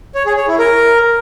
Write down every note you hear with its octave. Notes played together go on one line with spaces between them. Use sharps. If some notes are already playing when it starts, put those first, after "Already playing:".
C#5
G#4
C#5
E4
A#4